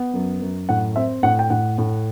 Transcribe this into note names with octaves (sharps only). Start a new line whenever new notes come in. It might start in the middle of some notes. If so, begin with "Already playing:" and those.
Already playing: B3
F#2
F#2
A2 F#5
C4 E5
A2 F#5
G5
A2 F#5
A2